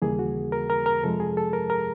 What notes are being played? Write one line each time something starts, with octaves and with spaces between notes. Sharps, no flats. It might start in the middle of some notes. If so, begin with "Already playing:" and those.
D#2 C#3 E3 G3 A#3 G#4
F#4
A#4
A#4
A#4
F2 C3 F3 G#3 A4
G#4
A4
A#4
A#4